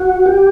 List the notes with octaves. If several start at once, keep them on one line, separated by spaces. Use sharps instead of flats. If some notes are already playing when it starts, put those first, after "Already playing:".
Already playing: F#4
G4